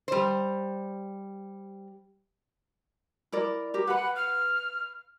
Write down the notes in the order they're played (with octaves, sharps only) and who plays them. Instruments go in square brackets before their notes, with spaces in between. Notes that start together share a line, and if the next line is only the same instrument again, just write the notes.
[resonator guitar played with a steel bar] G3 C5
[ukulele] E4 A#4 D5
G4 A#4
[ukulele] B4 B5 [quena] F#5
[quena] F6